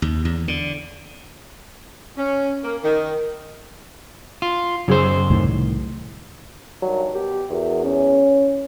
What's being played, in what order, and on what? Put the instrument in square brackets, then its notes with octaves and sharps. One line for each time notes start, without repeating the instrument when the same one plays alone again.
[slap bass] D#2
E2
D3
[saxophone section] C#4
A#3
D#3
[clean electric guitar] F4
[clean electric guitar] F#2 C5 [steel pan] C#3 F#3 G#4
[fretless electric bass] C2 A2 D#3
[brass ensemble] G2 D#3 [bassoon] F#3
[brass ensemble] B2 [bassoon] G4
[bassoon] E2 [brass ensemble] F#4 A#4 E5
[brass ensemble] C#4